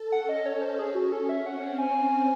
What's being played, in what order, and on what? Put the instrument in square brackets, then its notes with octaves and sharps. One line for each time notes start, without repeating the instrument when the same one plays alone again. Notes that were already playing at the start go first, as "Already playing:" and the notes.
Already playing: [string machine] A4
[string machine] C#4 [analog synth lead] F#5
[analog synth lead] D#5
C#5
C5
G#4
F#4
A4
E5
[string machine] C4 [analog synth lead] F#5
[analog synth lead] G#5